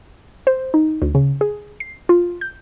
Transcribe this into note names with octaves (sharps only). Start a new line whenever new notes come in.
C5
D#4
D2
C#3
G#4
C7
F4
G6